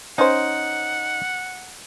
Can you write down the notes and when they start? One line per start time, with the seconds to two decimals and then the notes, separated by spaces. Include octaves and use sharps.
0.18 C#4 D#4 C5 F#5